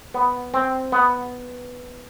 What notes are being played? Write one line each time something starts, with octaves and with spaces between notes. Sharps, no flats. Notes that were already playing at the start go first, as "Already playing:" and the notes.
B3
C4
B3